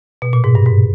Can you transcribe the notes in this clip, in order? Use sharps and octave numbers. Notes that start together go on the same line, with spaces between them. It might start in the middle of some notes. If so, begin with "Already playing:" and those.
B2
A#2
G#2
G2
G#2